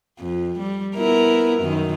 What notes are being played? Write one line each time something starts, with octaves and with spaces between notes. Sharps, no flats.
F2
G3
B3 E4 A#4
F#2 D#3